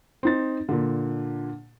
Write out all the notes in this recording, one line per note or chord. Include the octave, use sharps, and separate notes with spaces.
C4 D#4 A6
A#2 D3